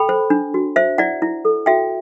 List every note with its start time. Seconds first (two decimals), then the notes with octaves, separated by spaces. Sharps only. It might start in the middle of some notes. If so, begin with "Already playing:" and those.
Already playing: A4 G5 B5
0.09 C5
0.30 D4
0.54 F#4
0.76 C5 E5
0.98 E4 D5 F#5
1.22 E4
1.45 A4
1.66 F#4 E5 G5